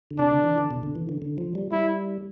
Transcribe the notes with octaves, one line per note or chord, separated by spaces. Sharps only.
D3
C3 D4
D3
E3
D3
B2
D3
E3
D3
D3
F3
G3
G3 E4